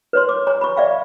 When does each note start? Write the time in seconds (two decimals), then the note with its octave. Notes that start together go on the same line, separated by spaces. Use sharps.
0.13 B4 C#5 C6
0.29 D6
0.47 C#5 G#5 A#5
0.61 B5 C#6
0.77 D5 E5 F5 G5